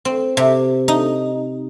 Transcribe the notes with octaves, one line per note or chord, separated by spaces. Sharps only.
C4
C3
D#4